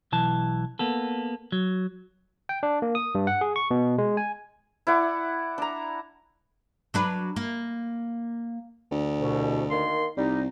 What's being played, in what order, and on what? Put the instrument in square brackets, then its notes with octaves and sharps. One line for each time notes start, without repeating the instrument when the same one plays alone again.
[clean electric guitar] B1 E3 A5
A#3 B3 A4
F#3
[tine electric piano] G5
D4
A#3
D#6
G2
F#5
G#4
C#6
B2
G#3
G#5
[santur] E4 D5 F#5
D4 A#5
[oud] F#3 D4 B4
A#3
[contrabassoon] D2
[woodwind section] C2 B2
D#3 A#3 C6
[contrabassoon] C2 [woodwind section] G3 D#4